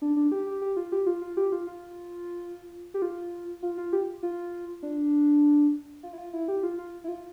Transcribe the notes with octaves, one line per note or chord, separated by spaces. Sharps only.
D4
D4
G4
G4
G4
F4
G4
F4
F4
G4
F4
F4
G4
F4
F4
F4
G4
F4
D4
F4
E4
F4
E4
G4
F4
F4
E4
F4